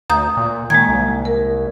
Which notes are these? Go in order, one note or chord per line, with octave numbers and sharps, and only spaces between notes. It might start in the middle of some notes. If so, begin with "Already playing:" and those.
D2 A#5 D#6 G6
A#2
D#3 G#3 A#3 G#6
C2
A#4